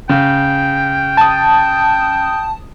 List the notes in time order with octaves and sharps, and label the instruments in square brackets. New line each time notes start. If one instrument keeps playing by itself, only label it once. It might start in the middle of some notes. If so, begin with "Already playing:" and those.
[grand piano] C#3 [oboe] G5
[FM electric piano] A5 D#6